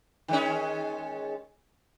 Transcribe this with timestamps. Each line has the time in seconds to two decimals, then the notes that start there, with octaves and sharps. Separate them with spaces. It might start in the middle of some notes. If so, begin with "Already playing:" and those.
0.28 D#3 G#3 C#4